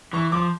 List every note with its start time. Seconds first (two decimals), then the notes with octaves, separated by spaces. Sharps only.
0.13 E3 C#6
0.32 F3 D6